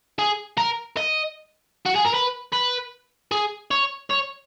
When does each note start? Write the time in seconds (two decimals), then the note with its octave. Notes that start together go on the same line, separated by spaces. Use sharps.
0.19 G#4
0.58 A#4
0.97 D#5
1.86 F#4
1.96 G#4
2.05 A#4
2.14 B4
2.53 B4
3.32 G#4
3.71 C#5
4.10 C#5